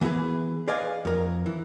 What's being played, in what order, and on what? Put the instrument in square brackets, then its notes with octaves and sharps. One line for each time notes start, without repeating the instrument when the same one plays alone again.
[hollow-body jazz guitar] E3 B3 E4 G#4 B4
G#4 B4 D5 D#5 F5 G#5
F2 A#4
E3